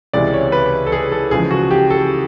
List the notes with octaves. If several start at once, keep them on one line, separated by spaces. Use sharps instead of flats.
C#2 C3 E3 G#3 D5
C#5
B4
A4
G#4
A4
E2 C#3 F3 G#3 G#4
F#4
G4
A4